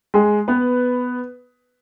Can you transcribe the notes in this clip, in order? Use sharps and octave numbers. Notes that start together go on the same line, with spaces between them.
G#3 G#4
B3 B4